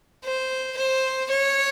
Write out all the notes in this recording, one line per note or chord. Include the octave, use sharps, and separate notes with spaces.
C5
C5
C#5